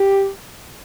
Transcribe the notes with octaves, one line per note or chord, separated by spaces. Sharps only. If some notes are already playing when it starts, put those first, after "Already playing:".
Already playing: G4